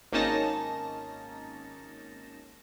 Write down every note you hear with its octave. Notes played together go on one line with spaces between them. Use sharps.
G#1 A#3 C#4 D#4 A5 A#6